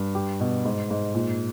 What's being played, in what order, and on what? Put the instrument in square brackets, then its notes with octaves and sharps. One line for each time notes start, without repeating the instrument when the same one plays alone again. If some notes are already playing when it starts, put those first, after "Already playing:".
Already playing: [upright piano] G2
G4
B2
G#2
G#2
A#2